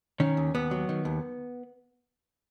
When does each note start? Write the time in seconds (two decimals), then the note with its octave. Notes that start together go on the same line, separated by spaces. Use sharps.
0.20 D#3 C#4
0.37 D#2
0.54 D#2 B3
0.71 F#3
0.89 D#3
1.05 D#2